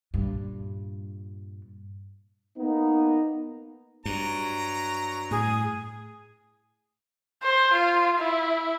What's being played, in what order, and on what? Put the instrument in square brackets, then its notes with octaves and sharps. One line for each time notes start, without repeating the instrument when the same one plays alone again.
[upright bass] G2 A#2
[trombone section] A#3 B3 D#4
[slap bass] G2 [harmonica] F#3 A#5
[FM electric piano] A2 [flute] G#4
[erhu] C5
F4
E4